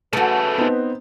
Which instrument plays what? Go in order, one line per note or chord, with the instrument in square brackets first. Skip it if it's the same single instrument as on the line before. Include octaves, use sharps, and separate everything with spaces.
[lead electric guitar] C#3 A3 [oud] F#4 A4 [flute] B4
[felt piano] B3 C4 D#4